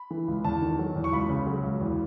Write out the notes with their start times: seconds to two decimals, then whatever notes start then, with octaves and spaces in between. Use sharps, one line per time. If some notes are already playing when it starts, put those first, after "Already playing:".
Already playing: B5
0.11 E3
0.28 C#2
0.45 E2 A5
0.62 D#3
0.79 F#3
0.96 E2
1.04 C#6
1.13 C#2 B5
1.30 C#3
1.46 F#3
1.64 C#2
1.81 E2